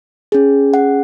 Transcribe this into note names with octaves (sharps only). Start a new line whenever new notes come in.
C#4 G#4
F#5